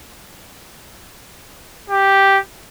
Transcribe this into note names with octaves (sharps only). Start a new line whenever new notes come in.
G4